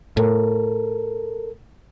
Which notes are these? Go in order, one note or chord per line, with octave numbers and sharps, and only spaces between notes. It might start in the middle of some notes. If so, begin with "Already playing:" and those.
A2 A4 A#4